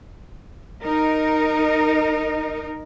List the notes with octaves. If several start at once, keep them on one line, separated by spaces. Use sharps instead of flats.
D#4 A#4